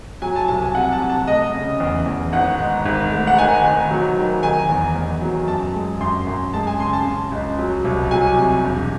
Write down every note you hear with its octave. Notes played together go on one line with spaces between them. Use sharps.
F#3 G#5
A5
C2 A5
G#5
C3 F#5
A5
C3
A5
A3 D#5
C#3
E2
E2
G#1 F#5
G#2
G#1
A3
F#5
D#3 G#5
D#3
F#3
D#3
D#3 G#5
E2
E2
F#3
F#2 A5
G#3
F#2 C6
F#2
G#3 A5
G#5
C#3 C6
A5
C#3
C#2
F#3
C2
F#3 G#5
C3
E1